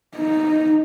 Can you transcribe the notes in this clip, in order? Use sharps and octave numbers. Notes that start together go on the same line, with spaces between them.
D#4